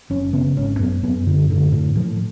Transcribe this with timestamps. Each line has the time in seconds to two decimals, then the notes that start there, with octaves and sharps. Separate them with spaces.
0.10 F#1 C#4
0.33 C#3 B3
0.57 G#1 C#4
0.76 C#4
0.79 F#2 B3
1.03 F#2 B3
1.26 F#2 D3
1.50 A2 D3
1.72 A2
1.95 A2 F3